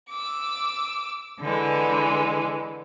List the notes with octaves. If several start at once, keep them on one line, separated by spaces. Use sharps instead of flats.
D6 E6
D3 E3 G#3